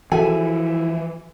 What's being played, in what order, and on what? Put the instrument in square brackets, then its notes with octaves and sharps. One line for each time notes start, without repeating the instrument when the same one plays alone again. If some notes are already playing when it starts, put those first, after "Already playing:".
[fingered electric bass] E3 F3 [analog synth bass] E4 [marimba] F#4 G#4 A4 [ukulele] G#5